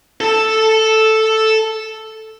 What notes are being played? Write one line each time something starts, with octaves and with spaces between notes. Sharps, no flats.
A4 A5